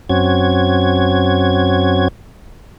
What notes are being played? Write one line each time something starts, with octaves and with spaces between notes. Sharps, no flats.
F#2 C4 C#4 F#4 G#6